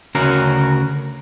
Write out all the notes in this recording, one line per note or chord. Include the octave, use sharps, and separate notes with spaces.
D2 C#3 C#4 F#4 A#4